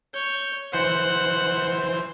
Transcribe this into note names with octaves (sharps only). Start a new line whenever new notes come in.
C#5 G6
E3 C5 F#5